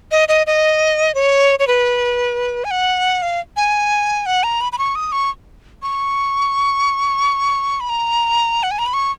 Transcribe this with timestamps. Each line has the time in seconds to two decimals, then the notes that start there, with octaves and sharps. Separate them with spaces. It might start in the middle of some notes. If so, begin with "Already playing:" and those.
0.11 D#5
0.28 D#5
0.47 D#5
1.15 C#5
1.59 C#5
1.67 B4
2.64 G#5
2.71 F#5
3.22 F5
3.57 G#5
4.26 F#5
4.43 A#5
4.61 B5
4.72 B5
4.78 C#6
4.95 D#6
5.12 C#6
5.82 C#6
7.80 B5
7.89 A#5
8.63 F#5
8.71 G#5
8.79 A#5
8.86 B5
8.94 C#6